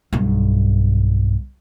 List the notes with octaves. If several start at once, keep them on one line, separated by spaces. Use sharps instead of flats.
B1 G2